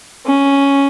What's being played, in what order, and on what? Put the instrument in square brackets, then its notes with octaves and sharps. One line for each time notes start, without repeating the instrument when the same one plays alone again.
[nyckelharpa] C#4